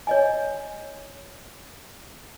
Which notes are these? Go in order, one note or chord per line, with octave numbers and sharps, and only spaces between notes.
C#5 D#5 G#5